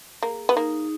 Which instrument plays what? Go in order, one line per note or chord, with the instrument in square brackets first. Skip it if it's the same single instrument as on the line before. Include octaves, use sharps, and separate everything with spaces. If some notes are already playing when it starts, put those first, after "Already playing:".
[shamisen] A#3 [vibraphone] G#4
[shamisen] B3
[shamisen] A#3 [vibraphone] D#4